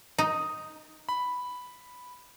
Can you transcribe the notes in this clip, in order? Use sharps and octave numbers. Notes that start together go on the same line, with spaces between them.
D#4
B5